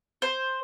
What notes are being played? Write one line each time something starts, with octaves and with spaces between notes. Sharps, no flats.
C5